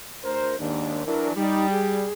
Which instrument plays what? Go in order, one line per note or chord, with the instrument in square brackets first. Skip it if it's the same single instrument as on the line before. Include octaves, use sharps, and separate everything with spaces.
[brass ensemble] D2 A#4 C5
D#2 G#2 D4
[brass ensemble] E3 F#3 D4 [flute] A#4
[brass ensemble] G3 [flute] D#4
[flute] G#4